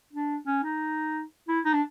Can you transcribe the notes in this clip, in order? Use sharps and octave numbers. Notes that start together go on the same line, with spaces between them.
D4
C#4
D#4
E4
D#4
D4